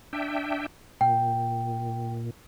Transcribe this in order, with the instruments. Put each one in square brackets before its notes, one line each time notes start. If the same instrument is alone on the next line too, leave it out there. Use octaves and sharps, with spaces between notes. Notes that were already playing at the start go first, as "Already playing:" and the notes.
[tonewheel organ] D4 E5 G5
[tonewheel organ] A#2 [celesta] G5